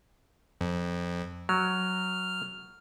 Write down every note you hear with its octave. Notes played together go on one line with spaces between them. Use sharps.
F2
F#3 F6